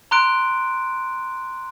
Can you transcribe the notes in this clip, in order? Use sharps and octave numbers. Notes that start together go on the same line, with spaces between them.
A#5 C6 F#6 D7